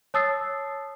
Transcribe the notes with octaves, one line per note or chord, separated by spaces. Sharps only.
C#5 A5 D#6 E6 A6 C7